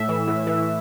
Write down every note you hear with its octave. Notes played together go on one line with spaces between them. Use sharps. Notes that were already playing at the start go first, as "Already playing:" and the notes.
Already playing: A2 E5
E3
A2
E3